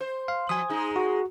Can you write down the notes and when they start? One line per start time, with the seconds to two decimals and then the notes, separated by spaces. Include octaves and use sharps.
0.01 C5
0.28 F5
0.49 F3 G#5 D#6
0.69 G#3 D#4
0.96 F#4